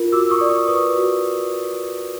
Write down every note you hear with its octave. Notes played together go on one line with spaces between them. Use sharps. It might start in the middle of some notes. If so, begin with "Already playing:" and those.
Already playing: F4 A#4
F#4 D6 E6
C#6 D#6
D5
C#6 D#6
B4 C#6 D#6
F#4